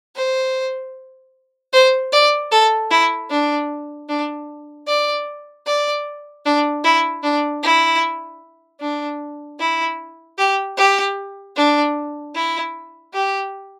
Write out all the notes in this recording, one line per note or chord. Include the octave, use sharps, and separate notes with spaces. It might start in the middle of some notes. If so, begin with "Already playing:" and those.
C5
C5
D5
A4
E4
D4
D4
D5
D5
D4
E4
D4
E4
D4
E4
G4
G4
D4
E4
G4